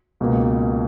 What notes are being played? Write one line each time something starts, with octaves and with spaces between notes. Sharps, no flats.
C#2 B2 A#3